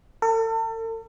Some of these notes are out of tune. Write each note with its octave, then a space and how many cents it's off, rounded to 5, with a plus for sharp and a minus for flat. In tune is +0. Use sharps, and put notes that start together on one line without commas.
A4 +40